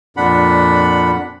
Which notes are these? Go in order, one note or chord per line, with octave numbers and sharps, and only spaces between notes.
F2 A#2 D4 F#5 B5